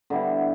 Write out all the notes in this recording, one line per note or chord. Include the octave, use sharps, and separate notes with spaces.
D3 G3 B3 E4